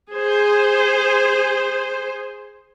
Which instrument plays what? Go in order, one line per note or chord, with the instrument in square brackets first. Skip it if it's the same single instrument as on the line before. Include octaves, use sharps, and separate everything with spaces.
[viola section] G#4 C5